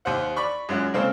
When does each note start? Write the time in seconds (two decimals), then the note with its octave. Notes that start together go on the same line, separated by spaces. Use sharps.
0.05 D#2 G4 C5 F#5
0.36 D5 B5 C#6
0.69 F#2 G#3 C#4 F4 F#4 F#6
0.94 C#3 G#3 A#3 C4 C#4 A4